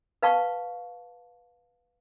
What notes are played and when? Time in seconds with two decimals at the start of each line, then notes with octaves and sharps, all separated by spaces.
0.22 B4 F5 A5 C#6